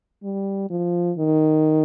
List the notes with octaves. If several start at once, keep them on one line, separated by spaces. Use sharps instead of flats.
G3
F3
D#3